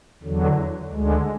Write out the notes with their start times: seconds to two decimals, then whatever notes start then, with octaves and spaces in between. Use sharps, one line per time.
0.23 E2 D3 F#3
0.91 D2 D3 G#3